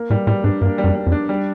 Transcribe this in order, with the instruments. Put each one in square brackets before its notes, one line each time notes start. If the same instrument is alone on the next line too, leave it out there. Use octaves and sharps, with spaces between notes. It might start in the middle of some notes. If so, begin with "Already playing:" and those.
Already playing: [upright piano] A#3
[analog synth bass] A2 [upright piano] G3
[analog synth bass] A2 [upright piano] G3
[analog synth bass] G#2 [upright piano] D4
[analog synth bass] G2 [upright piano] A#3
[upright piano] G3
[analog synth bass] F#2
[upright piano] G3
[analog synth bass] F2
[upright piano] D4
G3